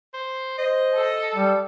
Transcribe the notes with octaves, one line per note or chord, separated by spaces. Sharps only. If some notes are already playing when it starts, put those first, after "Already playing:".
C5
C5 D#5
A4
G3